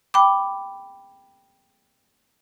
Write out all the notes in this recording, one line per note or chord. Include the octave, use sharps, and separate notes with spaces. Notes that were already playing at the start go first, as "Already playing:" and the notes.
G5 B5 D6